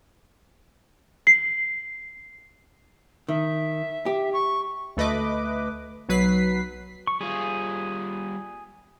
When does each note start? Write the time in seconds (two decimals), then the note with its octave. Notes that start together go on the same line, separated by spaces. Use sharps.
1.27 C7
3.29 D#3 E5
4.06 G4
4.33 C#6
4.97 D2 A3 B4 D#5 D6
6.09 B1 F#3 B4 B6 C7
7.07 C#6
7.21 G3 F4 G#4